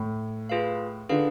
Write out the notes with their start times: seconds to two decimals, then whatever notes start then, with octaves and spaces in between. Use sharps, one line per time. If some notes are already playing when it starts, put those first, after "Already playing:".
Already playing: A2
0.49 F4 G#4 B4 F5
1.09 D3 F4 G#4 B4 F5